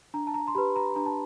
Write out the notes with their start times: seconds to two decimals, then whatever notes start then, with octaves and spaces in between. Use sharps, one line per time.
0.14 D4 A#5
0.27 A5
0.34 A#5
0.48 C6
0.55 G4 B4 B5
0.76 A#5
0.96 D4 A#5
1.06 A5